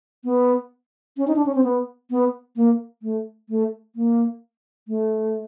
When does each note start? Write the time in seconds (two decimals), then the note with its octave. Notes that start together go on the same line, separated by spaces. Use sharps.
0.24 B3
1.17 C#4
1.27 D#4
1.36 D4
1.46 C#4
1.55 C4
1.64 B3
2.11 B3
2.56 A#3
3.02 A3
3.49 A3
3.96 A#3
4.88 A3